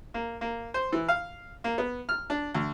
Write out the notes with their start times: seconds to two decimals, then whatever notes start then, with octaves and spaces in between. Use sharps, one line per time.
0.14 A#3
0.41 A#3
0.74 C5
0.92 E3
1.08 F5
1.64 A#3
1.78 B3
2.09 F6
2.30 D4
2.54 D2